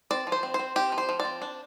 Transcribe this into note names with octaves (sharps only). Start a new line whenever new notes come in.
C4 D5
F3
C5
C4
C5
C4
C4 G4
F3
C5
F3
D5
C4
D4